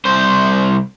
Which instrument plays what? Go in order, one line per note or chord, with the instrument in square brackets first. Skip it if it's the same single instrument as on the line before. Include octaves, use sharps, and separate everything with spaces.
[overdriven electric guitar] C2 C5